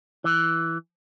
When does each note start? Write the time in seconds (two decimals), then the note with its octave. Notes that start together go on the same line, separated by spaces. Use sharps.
0.24 E3